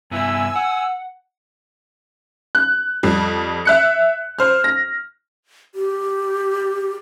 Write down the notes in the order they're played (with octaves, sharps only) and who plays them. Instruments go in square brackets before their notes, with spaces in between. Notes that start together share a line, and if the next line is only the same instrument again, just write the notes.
[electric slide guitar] G2 B3 E4 [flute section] G#5 E6
[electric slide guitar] F#5
[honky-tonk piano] F#6
F2 G3
E5 F#6 C#7
C5 F6
A#6
[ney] G4